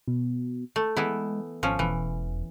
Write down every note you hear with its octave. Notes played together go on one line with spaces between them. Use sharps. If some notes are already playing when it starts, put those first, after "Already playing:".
B2
A3
E3 G#3 B3 E4
G#1 F3 C#4
E1 E3